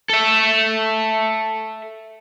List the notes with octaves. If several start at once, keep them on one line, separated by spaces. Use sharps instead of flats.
A4 E5